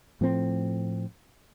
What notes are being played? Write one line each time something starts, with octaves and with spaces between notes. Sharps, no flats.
A2 F3 A3 C4